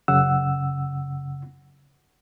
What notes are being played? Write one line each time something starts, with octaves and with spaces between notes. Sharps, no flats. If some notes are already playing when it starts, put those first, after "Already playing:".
F#2 C#3 F#5 E6